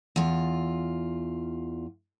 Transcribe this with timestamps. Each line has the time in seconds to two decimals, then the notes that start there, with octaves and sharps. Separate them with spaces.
0.16 E2 F4